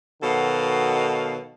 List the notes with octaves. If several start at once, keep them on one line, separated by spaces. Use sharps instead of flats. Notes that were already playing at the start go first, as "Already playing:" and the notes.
B2 D#3 F#3 A4 F5